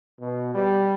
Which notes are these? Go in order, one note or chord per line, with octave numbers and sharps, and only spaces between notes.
B2
G3